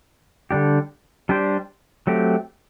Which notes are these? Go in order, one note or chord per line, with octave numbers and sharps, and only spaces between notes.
D3 G3 D4 G4
G3 D4 G4 C5
F#3 A3 C4 G4